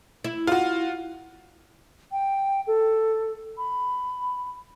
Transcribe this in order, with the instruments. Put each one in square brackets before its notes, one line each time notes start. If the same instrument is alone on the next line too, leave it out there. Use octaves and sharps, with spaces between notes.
[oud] E4
[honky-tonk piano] F4 F#4
[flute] G5
A4
B5